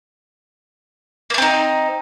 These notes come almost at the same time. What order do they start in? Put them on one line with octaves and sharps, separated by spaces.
A#3 A3 C4 D#4